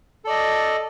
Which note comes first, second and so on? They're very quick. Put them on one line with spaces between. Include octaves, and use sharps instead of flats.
A4 D5 D#5